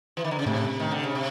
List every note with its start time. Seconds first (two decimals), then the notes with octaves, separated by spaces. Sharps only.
0.17 E3
0.24 D#3
0.31 D3
0.39 C#3
0.46 A2 C3
0.80 D#3
0.91 D3
1.04 C#3
1.15 C3